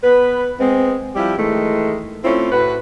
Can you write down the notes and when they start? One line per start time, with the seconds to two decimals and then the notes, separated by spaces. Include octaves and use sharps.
0.04 B3 B4
0.59 G#3 B3 C4
1.15 F3 G3 E4 G4
1.37 D#3 E3 G#3 A3
2.24 A3 C4 C#4 E4 F4
2.51 A2 F#4 B4